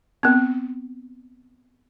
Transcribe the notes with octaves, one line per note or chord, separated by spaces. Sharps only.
B3 C4